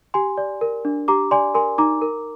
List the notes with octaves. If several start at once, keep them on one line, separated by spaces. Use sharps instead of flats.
G4 G#5 C6
D5
A#4
D4
G4 A#5 D6
D5 G#5 C6
A#4 G#5 C6
D#4 A#5 D6
A#4